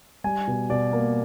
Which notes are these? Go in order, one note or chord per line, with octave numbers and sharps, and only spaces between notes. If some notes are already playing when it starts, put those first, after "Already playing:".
G3 G#5
B2
B2 D5
A#3